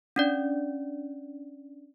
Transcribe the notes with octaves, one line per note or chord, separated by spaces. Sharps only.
C#4 D4 D5